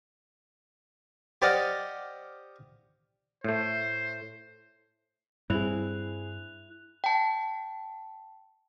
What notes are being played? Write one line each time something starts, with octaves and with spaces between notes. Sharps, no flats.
G4 C5 D5 D#5 F5 F#5
A2 A3 C5
G2 G3 C4 E4 G#4 F#6 F7
G5 A5